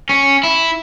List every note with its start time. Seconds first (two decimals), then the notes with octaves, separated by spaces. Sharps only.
0.09 C#4
0.43 E4